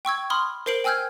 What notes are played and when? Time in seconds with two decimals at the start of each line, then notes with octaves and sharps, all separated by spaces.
0.05 G5 C#6 E6 G#6
0.30 B5 C6 D#6 F6
0.66 A#4 C5 C7 D7 F#7
0.84 G5 G#5 E6 F6 G6 G#6